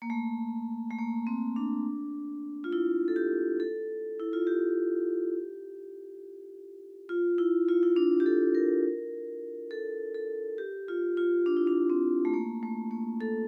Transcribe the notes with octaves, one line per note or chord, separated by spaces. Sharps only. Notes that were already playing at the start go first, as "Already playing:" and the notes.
A#3
A3
A3
A#3
C4
D4
F4
E4
A4
G4
A4
E4
F4
G4
F4
E4
F4
E4
D4
G4
A4
A#4
A4
A4
G4
F4
F4
D4
E4
D4
C4
A3
A#3
A3
A#3
A4